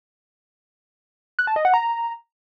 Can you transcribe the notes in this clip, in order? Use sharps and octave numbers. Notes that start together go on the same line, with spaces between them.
F#6
A5
D#5
F#5
A#5